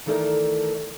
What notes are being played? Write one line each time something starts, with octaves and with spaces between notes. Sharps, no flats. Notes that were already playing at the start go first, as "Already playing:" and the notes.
D#3 E3 A3 A4 A#4 D5